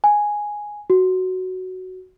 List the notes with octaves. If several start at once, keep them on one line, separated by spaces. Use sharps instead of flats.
G#5
F#4